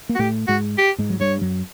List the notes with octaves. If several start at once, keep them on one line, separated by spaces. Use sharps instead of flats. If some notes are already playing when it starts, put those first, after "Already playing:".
A#3
F#4
A2 A3 G4
G#2 G#3 F#4
G4
G#2 G#3
F#3
G2 G3 C#5
F#2 F#3